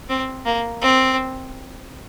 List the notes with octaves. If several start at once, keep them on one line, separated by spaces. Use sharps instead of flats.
C4
A#3
C4